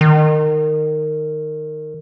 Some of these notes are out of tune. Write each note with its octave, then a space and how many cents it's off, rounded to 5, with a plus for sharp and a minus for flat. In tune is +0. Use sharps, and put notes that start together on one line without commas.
D#3 -20